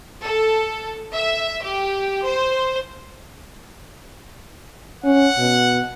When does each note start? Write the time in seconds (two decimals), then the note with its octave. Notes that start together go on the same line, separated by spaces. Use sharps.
0.24 A4
1.15 E5
1.63 G4
2.25 C5
5.04 C#4 F#5
5.38 B2